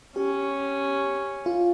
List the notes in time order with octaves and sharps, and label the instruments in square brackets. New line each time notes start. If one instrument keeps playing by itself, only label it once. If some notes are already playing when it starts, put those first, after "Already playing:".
[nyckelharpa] C#4 [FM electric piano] G4
[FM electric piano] F4